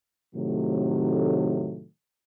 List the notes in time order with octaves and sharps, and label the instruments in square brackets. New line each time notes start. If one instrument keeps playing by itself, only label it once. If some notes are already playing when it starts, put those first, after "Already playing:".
[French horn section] A2 C3 D#3 F#3 A3